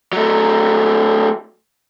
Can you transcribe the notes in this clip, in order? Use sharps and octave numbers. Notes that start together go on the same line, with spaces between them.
F#3 A3